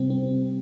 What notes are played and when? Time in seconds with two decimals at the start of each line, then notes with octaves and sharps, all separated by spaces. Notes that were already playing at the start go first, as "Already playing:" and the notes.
Already playing: C3 G3 C4
0.10 C4